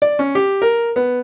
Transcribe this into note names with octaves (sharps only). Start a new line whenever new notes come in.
D5
C#4
G4
A#4
B3